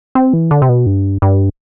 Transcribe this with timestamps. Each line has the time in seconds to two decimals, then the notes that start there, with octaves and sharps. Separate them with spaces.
0.15 C4
0.33 E3
0.51 D3
0.62 C3
0.69 B2
0.86 G2
1.22 G2